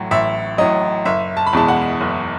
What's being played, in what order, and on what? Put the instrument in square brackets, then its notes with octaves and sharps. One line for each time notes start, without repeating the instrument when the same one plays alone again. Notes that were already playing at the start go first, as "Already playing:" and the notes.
Already playing: [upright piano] A1 A2 F#3
A1 E5
A2 F#3 D#5
F#1 E5
A5
B5
E2 B2 G#3 A5
F#5
F#1